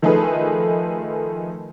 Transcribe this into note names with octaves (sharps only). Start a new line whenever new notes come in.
D#3 F3 A3 D#4 G#4 B4